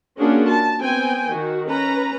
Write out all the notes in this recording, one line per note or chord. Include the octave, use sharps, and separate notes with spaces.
A#3 C#4 D4 F4 F#4 G#4
A5
B3 C4 G5 G#5
D#3 F#4
C#4 B4 A#5